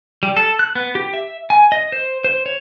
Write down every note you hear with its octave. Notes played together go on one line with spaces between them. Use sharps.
G3
A4
F#6
B3
G4
E5
G#5
D#5
C5
C5
C#5